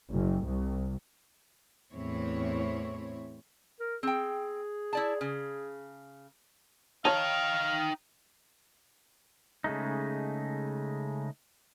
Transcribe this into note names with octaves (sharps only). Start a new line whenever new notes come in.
F#1
C2
E2 A2 C4 E4 C#5
A#4
C4 G#4 G5
E4 D5 A5
C#3
D#4 C#5 F5 G5 A5
C#3 G#3 A3 D#4